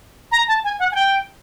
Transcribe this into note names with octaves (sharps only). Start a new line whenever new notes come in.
A#5
A5
G#5
F#5
G#5
G5